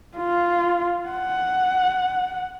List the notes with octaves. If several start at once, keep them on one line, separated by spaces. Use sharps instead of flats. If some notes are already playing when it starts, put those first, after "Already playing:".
F4
F#5